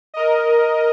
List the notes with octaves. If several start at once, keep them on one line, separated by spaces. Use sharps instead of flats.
A#4 D#5